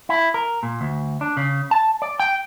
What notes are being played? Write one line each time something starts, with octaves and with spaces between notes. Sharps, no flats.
E4
A#4
A#2
D2
D4
C#3
A5
D5
G5